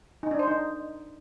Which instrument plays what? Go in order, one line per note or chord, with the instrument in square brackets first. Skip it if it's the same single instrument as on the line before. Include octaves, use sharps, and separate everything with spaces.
[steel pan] D#4
D4
C5
D#4